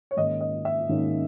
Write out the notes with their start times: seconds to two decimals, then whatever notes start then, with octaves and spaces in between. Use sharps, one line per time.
0.11 C#5
0.17 G#2 D#3 A#3 C#4 D#5
0.41 D#5
0.65 E5
0.89 G#2 D#3 A#3 C#4